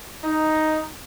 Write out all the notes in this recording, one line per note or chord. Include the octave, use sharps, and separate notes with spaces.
D#4